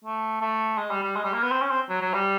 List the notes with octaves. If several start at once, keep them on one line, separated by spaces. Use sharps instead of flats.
A3
A3
G#3
G3
G3
G#3
G3
A#3
B3
C4
C#4
C4
F#3
F#3
G3